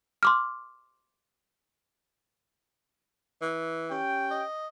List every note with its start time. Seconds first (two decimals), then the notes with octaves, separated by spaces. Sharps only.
0.23 C6 D6 F6
3.42 E3
3.90 C#4 G4 G5
4.31 D#5